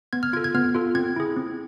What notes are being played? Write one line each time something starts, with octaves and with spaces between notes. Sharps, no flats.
B3 G#6
F6
F4 A4 G#6
G#6
B3 F6
F4 A4
C4 G#6
E4 G#4
C4